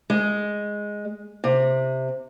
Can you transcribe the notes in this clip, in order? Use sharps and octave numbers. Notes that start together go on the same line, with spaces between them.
G#3
C3